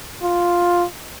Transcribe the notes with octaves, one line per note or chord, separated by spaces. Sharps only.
F4